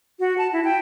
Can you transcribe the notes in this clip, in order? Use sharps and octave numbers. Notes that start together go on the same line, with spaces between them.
F#4
A5
E4
G5